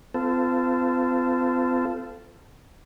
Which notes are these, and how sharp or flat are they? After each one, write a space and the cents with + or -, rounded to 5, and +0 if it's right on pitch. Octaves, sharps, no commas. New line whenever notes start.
C4 -40 F4 -20 A4 +0